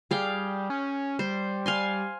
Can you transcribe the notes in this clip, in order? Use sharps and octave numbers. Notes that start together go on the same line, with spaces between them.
G3 G#4 F5 G5
C#4
G3 C5
F5 G#5 C6